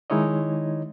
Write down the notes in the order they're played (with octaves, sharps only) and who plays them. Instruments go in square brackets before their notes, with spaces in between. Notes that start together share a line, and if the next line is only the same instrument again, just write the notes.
[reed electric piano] D#3 G#3 D#4 E4 C#5 D#5